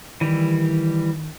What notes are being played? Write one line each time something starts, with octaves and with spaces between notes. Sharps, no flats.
D#3 E3 G3